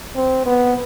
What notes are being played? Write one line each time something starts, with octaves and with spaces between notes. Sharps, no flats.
C4
B3